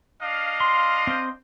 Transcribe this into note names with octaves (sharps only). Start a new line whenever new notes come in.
D4 D#5 F5
C6
C4 C5